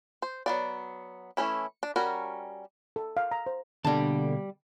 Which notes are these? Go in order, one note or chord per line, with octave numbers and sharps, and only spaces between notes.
C5
F#3 B3 D5
E3 A3 C#4 E4
D4
G3 C#4 F#4 A#4
A4
F5
A#5
C5
B2 D3 G3 A#3 A5